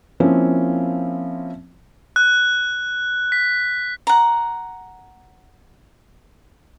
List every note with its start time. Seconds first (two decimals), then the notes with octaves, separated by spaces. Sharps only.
0.20 F3 A#3 C4 C#4 E4
2.16 F#6
3.32 B6
4.07 F#5 A#5